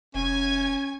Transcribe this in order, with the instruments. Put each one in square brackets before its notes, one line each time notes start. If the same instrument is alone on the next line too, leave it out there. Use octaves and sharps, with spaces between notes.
[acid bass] F1 [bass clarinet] C#4 [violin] G#5 G#6